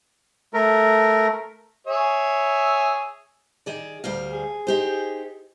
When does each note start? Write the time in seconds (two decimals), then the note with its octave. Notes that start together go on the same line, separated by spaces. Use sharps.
0.54 A3 A#4
1.87 G#4 C#5 E5
3.66 D#3 G#4 D5
4.04 D2 G3 F5
4.33 G#4
4.67 D#4 G4 C5